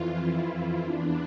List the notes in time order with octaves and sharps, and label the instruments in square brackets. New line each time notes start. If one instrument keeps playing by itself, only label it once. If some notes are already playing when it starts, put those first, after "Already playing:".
Already playing: [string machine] F2 E3 F4
E4
E2 E3 D4